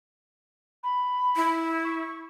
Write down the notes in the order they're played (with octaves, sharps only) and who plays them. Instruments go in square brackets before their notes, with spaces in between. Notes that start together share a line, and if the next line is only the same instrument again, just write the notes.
[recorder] B5
[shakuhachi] E4
[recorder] C#6